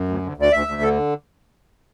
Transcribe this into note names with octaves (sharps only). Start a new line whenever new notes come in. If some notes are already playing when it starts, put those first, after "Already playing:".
Already playing: F#2
D2
D2
D2 D5
D2 E5
D2
D3 A4